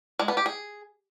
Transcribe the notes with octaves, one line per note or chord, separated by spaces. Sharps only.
G#3
B3
G4
G#4